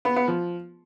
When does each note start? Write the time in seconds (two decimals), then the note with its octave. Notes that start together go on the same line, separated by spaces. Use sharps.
0.05 B3
0.16 B3
0.28 F3